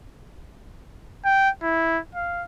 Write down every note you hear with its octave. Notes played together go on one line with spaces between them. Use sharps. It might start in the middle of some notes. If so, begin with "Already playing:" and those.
G5
E4
F5